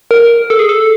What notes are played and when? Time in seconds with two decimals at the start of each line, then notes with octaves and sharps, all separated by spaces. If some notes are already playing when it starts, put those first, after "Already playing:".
0.11 A#4
0.50 A4
0.59 G#4
0.69 A4